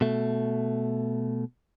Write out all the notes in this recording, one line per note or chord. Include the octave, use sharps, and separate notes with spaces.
B2 A3